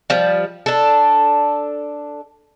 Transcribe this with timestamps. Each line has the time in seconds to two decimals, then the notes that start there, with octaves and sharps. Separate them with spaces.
0.10 F3 G3
0.66 D4 A4